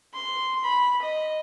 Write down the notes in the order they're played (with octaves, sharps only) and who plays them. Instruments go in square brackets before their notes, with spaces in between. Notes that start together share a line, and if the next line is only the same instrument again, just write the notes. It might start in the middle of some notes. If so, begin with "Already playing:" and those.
[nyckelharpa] C6
B5
D#5